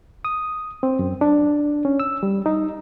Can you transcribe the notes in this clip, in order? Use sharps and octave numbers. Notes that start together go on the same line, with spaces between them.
D#6
C4
F#2
D4
C#4
E6
G3
D#4